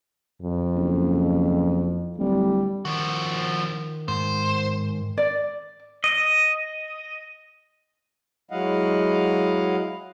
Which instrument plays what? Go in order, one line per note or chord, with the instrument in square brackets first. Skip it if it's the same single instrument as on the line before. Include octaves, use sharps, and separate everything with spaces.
[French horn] F2
[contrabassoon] F#1
[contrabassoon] D1 [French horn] G3
[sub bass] D#3 [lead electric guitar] F3 F#4
[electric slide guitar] G#2 [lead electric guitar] C5
[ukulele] D5
[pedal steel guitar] D#5
[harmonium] F#3 G#3 E4 D#5 F5 F#5